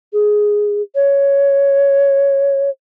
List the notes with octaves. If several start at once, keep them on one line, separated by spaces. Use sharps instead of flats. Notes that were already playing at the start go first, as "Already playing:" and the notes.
G#4
C#5